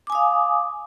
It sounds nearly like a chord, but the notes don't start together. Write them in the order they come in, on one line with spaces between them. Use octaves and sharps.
D6 G#5 D#6 F5